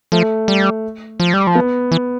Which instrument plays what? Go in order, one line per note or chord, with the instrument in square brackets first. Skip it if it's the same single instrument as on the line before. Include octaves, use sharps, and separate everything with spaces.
[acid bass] F3 [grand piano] A3
[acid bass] G3
F3
G3
F3
[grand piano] B3
[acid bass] E3